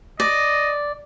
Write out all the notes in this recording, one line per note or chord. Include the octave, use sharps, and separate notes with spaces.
D5 D#5